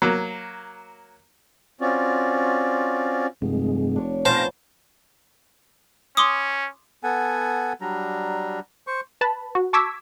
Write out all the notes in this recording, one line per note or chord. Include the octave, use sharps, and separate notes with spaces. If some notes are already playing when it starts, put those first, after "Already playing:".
F#3 A#3
C4 C#4 F4 F#4 D5
F1 G2 C3 G#3
D4 C#5
F3 B3 C#4 C5 F5 G5 A5 A#6
C#4 C6 D6 D#6
B3 A4 F#5 G#5
F#3 G3 D4 A#5
C5 C#6
B4 A5 B5
F#4
A5 C#6 D6 E6 G#6 B6